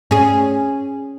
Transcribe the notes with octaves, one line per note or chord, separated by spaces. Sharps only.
C#4 G#4